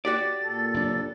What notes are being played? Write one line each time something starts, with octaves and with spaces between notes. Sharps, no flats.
F#4 G4 D5 A6
A#2 A4
F#1 F#2 D4